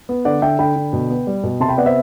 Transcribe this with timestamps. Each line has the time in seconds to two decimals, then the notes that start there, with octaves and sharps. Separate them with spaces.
0.09 B3
0.25 D3 D5 F#5
0.42 D3 E5 G5
0.59 D3 G5 B5
0.76 D3
0.93 B2
1.10 B3
1.27 G3
1.43 B2
1.60 C3 A5 C6
1.69 G5 B5
1.78 B3 D5 F#5
1.86 C5 E5